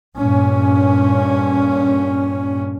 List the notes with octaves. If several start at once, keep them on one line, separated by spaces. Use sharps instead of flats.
G2 A#2 C#4